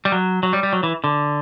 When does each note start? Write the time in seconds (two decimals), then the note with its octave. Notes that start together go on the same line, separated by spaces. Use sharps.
0.05 G3
0.12 F#3
0.43 F#3
0.53 G3
0.63 G3
0.73 F#3
0.83 E3
1.04 D3